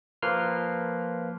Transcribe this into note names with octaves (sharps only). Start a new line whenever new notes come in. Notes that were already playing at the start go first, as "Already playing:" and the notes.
F3 A#3 B4 C6 F6